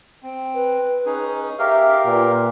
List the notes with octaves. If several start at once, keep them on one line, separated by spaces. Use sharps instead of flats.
C4
B4
C#4 D#4 G#4
G4 A#4 E5 F5
A#2 B4